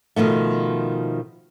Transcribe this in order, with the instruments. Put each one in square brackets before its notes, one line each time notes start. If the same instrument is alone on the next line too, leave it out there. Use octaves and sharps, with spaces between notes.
[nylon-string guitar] B2 D#3 F3 A3